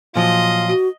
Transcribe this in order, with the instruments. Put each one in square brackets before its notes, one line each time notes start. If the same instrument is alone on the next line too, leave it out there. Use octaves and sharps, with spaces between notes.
[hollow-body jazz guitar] A#2 F3 F#3 [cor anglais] F4 [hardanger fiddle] D#5
[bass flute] F#4